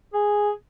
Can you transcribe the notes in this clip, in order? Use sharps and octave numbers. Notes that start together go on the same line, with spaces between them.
G#4